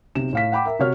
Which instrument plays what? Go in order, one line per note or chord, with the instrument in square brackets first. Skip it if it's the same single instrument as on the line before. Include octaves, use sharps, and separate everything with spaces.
[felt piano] B1 C3 E7
A2 F5 B6
F#5 G5 B5 D6
A#4 E5
C3 F#4 C#5 F6